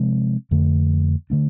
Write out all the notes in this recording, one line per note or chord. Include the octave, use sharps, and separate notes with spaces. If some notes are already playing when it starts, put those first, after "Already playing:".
Already playing: C3 F3 G#3 C4
F2 D3 A3
D3 A3 D4